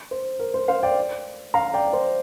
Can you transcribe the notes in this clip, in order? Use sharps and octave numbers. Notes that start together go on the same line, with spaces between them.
C5
A#4
C5
C5 F5
D5 G5
F5 A#5
D5 G5
C5